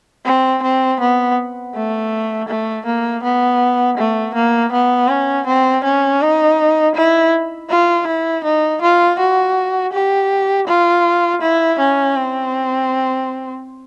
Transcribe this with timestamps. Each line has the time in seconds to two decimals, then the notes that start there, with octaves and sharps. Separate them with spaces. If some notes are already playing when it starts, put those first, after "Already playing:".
0.25 C4
0.63 C4
1.00 B3
1.75 A3
2.48 A3
2.86 A#3
3.23 B3
3.98 A3
4.35 A#3
4.72 B3
5.09 C#4
5.47 C4
5.84 C#4
6.21 D#4
6.95 E4
7.70 F4
8.07 E4
8.44 D#4
8.81 F4
9.19 F#4
9.93 G4
10.67 F4
11.41 E4
11.79 C#4
12.16 C4